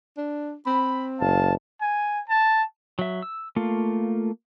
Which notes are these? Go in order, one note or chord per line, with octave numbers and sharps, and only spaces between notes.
D4
C4 B5
F#1 F5 A5
G#5
A5
F#3 E5
E6
A3 A#3 F4